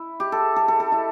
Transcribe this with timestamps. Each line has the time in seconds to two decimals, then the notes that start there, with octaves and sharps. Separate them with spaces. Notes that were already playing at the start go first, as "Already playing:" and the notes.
Already playing: E4
0.20 G4
0.32 A4
0.56 A4
0.68 A4
0.80 A4
0.92 E4